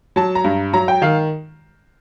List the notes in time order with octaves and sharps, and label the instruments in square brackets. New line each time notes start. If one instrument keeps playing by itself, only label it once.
[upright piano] F#3 A5
A#5
G2
F#3 A#5
G5
D#3 F5